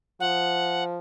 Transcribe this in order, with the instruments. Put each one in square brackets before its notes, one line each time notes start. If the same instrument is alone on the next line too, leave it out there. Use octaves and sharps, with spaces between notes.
[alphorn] F3 [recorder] F#5